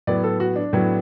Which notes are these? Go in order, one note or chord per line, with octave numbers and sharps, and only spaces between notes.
A2 F#3 B3 D5
A4
F#4
D4
A2 F#3 B3